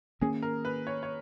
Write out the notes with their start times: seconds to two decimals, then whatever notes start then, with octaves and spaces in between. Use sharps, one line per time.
0.21 D#3 A#3 C#4 G#4
0.42 A#4
0.65 B4
0.87 C#5
1.03 C#5